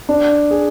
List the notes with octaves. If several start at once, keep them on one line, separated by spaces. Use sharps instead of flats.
D4
G#4